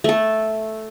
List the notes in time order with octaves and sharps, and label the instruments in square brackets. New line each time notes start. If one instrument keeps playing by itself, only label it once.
[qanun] A3 A4